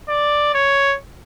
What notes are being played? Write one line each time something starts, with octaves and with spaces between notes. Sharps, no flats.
D5
C#5